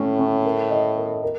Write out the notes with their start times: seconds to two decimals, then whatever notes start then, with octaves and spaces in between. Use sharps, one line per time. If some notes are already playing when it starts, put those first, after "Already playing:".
Already playing: A2 A3 C#4
0.19 C#4
0.45 A#4
0.70 D#5
0.97 A#4
1.23 A#4